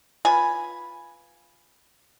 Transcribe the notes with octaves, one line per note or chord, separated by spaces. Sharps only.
F4 B4 G#5 B5